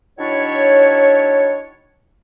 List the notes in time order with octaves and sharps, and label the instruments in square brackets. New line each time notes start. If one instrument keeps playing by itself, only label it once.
[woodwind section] D#3 F#3 D4 E4 C#5